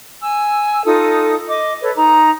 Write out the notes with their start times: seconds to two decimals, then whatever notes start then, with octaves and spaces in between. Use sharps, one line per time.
0.22 G#5 E6
0.86 D#4 F4 A4 D#6
1.48 D#5 D6
1.82 A4 B4 C#5
1.97 D#4 A#5